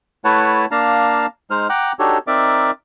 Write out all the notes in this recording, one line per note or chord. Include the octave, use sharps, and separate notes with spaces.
A3 E4 B4 C#5 F#5 A5
A#3 D4 F5 A5 A#5
G#3 D#4 C5 F6
F#5 G5 A#5 D6 F#6
D4 D#4 F#4 G4 A4 C#5
C4 D#4 A#4 D5 E5 D6